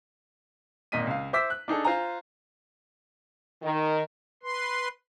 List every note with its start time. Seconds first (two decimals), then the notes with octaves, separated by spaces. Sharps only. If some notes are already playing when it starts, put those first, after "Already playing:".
0.92 G#1 A#2 D#5 B6 D#7
1.07 C#2 F5
1.33 C5 E5 D6 E6 B6
1.50 F#6
1.68 D4 D#4 G#4 A4
1.85 F4 C5 G#5 A#5
3.62 D#3
4.43 B4 C6